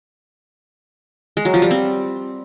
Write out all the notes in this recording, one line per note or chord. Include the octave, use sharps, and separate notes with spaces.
G#3
F#3
F3
G3
C4